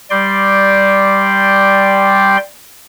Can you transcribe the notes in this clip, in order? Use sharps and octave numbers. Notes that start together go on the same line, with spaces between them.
G3 D5 G5 C6